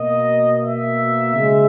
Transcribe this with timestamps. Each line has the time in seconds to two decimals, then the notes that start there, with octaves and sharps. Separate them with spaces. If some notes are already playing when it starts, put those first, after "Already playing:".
Already playing: B2 A#3 D#5
0.61 E5
1.33 C#3 G#3